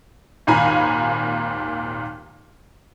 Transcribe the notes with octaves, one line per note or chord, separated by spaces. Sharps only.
G#1 D#2 A#2 G#5 A#5 B5